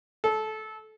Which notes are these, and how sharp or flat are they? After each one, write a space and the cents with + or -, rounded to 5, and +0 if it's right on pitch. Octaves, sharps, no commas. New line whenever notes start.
A4 -20